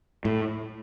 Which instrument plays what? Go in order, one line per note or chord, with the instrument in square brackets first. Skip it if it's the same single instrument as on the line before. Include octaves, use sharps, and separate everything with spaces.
[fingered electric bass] A2